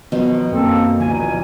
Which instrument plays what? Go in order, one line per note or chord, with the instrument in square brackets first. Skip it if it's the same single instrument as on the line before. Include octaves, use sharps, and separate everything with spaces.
[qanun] B2 D#3 D#4 [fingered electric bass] F3 F#3 B3
[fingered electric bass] F#2 [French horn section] A#3 [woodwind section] C4 A4
[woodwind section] C#2 A#2 G#5 [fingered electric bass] D3 E3 F3